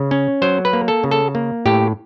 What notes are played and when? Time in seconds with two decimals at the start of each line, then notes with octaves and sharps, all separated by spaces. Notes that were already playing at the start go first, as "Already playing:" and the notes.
Already playing: C#3
0.11 C#4
0.42 F#3 C5
0.65 B4
0.73 A#3
0.88 A4
1.04 C#3
1.11 A4
1.35 A#3
1.66 A2 G4